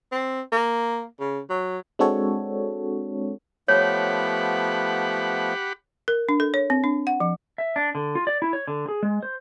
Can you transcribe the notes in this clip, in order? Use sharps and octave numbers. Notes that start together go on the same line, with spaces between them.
C4
A#3
C#3
F#3
G#3 C4 D4 F#4 A4 C#5
F3 A3 B3 G4 C#5 F#5 B5
A#4
D4
A4
C#5
C4
D4
F#5
F3
E5
D4
D3
F4
D5
E4
C#5
D3
G#4
G#3
C5